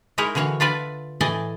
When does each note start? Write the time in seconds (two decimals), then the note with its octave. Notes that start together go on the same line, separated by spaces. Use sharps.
0.18 G#3 D#4 E4 A#4 C#5
0.35 D3 E3 F#4 C#5 F5
0.60 D4 F4 B4 D5 E5
1.21 A2 E3 G#4 D5 D#5 G#5